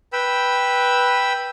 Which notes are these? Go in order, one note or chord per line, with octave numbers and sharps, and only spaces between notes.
B4 G5 B5 E6